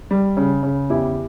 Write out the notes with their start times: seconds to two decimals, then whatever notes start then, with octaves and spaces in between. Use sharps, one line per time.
0.11 G3
0.37 C#3
0.63 C#3
0.90 E2 E4 G4